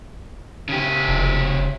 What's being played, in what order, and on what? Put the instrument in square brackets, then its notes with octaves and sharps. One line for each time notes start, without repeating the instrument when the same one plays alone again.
[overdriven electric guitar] C#3 G4
[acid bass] F1